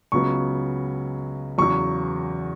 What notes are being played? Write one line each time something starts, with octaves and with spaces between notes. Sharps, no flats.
C#2 C#3 F#3 B3 C#6
E2 C#3 F#3 C#6